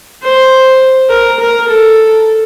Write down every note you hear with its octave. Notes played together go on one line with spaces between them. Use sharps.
C5
A#4
A#4
A4